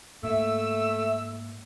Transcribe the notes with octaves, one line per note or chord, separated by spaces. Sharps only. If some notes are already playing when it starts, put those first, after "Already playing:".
G#2 A3 A#3 E5 E6